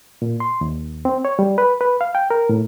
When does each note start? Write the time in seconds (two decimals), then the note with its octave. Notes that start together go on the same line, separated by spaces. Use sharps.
0.22 A#2
0.40 C6
0.61 D#2
1.05 C4
1.25 C#5
1.39 G3
1.58 B4
1.81 B4
2.01 F5
2.15 G5
2.30 A#4
2.49 A2